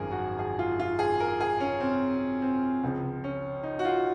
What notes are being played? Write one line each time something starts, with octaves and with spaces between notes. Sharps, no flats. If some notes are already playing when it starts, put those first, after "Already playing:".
Already playing: G#1 F#2 F3 G#3 G#4 A#4
F#4
G#4
F4
F4
G#4
A#4
G#4
C#4
C4
C4
C#2 C#3 F3
C#4
D#4
F#4
F4